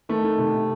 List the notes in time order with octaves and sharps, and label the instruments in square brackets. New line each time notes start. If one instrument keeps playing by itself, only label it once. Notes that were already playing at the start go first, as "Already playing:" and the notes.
[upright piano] D#3 A3
D#3
C3
C3